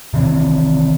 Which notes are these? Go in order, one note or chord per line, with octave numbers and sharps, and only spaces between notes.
C3 D#3 E3 C4